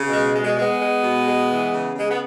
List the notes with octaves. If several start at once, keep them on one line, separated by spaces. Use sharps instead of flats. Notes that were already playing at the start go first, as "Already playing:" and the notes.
Already playing: C#3
B2 G#3
G#3
G#3
G#3
B3
G#3
B2
G#3
E3
C#3
C#3 G#3
B3